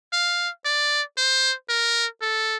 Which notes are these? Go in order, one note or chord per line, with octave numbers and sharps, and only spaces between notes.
F5
D5
C5
A#4
A4